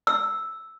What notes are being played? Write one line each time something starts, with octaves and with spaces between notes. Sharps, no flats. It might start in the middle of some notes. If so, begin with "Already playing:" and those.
E6